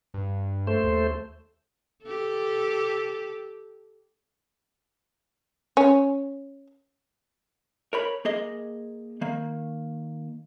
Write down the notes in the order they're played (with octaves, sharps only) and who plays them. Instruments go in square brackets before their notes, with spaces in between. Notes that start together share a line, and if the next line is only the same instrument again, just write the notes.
[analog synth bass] G2
[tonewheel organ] A3 C5
[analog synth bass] D#2
[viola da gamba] G4 A4
[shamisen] C#4
[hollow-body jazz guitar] A#4 C#5 B5
A#3 G#4 D#5
D#3 A#3